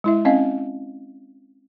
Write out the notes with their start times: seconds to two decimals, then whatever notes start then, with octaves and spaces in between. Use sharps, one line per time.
0.04 G#3 E4 E5
0.25 C4 C#4 D#5 F5